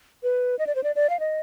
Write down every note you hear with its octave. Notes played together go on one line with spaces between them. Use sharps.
B4
D#5
D5
C5
D5
D5
F5
D#5